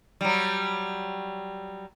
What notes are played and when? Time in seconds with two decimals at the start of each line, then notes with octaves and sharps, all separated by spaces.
0.21 F#3 G3